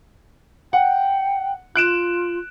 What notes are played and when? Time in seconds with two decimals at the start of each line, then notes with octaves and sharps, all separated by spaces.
0.73 F#5 G5
1.76 F4 F#6 D7 E7